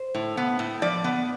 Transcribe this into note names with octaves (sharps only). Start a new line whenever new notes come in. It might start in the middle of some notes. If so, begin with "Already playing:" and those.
Already playing: C5
A2
B3
A2
F3 D5
B3